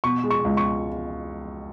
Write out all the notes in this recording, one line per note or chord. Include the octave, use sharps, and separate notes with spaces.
B2 C#6
G#3
C#6
C#2
C#6